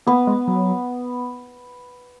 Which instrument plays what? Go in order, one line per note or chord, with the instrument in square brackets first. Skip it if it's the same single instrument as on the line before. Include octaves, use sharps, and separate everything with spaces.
[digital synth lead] A#3 [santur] B3
[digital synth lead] G#3
F#3